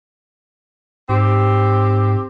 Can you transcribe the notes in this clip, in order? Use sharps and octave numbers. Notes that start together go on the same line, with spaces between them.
G#2 C4 G4